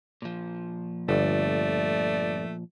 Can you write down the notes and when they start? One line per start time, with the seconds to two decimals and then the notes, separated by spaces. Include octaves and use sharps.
0.22 A#2 F3
1.09 G1 A3 D5